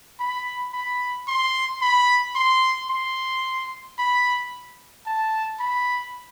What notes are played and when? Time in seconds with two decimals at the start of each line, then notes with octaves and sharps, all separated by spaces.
0.20 B5
0.73 B5
1.28 C6
1.82 B5
2.36 C6
2.90 C6
3.99 B5
5.07 A5
5.60 B5